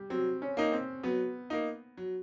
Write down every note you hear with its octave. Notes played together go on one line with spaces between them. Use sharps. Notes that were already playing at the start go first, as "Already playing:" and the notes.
Already playing: G3
F#3 C4
C#4
A#3 D#4
C4
F#3 B3
A#3 D#4
F#3